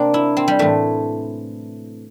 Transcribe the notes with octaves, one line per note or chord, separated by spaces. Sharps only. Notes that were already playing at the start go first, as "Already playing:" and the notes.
Already playing: C3 A#3 C4 D4
E4
C4
G3
A2 E3 A3